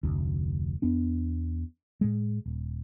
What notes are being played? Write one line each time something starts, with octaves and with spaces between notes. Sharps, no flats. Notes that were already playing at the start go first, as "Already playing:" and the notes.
F1 D2
E2 B3 D4
A2 G#3
D#1